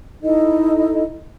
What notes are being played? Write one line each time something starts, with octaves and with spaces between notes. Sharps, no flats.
D#4 E4 A4 D#5